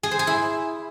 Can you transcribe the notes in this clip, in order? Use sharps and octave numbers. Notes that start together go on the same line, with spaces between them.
G#4
C5
G#4
E4